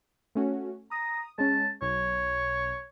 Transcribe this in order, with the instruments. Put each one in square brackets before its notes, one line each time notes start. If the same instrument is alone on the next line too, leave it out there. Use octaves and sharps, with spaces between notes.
[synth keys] A3 C#4 F#4
[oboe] A#5 [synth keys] D#6
[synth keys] G#3 C#4 [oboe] A5
[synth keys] B1 [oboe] C#5